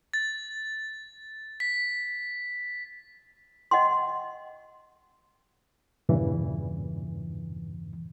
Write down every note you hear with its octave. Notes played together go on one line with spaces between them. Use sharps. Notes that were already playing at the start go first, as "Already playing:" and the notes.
A6
B6
D#5 F#5 G5 C6
E2 G2 A#2 C#3 E3